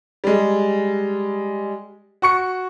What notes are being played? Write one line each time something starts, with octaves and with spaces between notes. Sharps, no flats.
G3 G#3
F#4 C#6 C#7